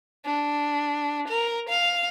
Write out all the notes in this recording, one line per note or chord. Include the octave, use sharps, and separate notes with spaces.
D4
A#4
F5